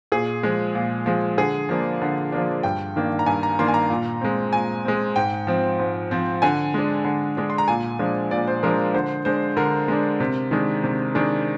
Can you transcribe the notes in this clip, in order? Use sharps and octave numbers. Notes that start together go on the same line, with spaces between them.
A#2 G#4
F3 G#3
A#2
F3 G#3
D3 G#4
F3 A#3 D4
D3
F3 A#3 D4
G2 G5
D#3 A#3 D4
A#5
G2 G#5
A#5
D#3 A#3 D4 C6
G#5
A#5
A#2
G#3 C4
A#2 G#5
G#3 C4
G#2 G5
F3 C4
G#2
F3 C4
D3 G#5
G#3 D4
D3
G#3 D4
C6
A#5
A#2 G#5
F3 G#3 D4
A#2 D5
C5
F3 G#3 D4 A#4
D3 C5
G#3 D4 C5
D3 A#4
G#3 D4
C3
D#3 G#3 D4
C3
D#3 G#3 D4